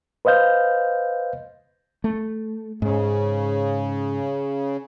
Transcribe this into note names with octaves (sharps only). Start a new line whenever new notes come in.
B4 C5 D#5 F5 G6
A3
G#2 C#3